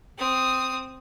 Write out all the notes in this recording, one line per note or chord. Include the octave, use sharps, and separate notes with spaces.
C4 D#6